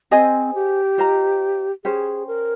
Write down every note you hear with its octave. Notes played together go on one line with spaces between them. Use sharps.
C4 G#4 C5 D#5 G#5
G4
F4 C5 D#5 A#5
C#4 G4 G#4 C5
A#4